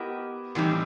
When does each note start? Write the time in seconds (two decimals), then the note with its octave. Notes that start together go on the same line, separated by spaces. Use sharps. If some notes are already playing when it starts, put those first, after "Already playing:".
Already playing: B3 E4 G4 A#4 D#5
0.55 A2 E3 G3 C4 D#4